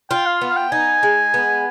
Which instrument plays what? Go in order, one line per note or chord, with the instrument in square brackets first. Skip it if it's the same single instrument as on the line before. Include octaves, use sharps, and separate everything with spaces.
[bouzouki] F4 [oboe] G5
[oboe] F5
[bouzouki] B3
[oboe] F5
G5
[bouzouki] D#4 [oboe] G#5
[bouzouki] G#3
B3